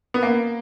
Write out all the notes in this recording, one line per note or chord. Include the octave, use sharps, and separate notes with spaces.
B3
A#3